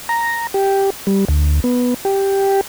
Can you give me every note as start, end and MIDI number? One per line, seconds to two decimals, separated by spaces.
0.09 0.47 82
0.54 0.90 67
1.07 1.25 55
1.28 1.60 38
1.64 1.94 59
2.05 2.61 67